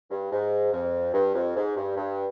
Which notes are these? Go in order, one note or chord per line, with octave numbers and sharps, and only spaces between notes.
G2
G#2
F2
G2
F2
G#2
G2
G2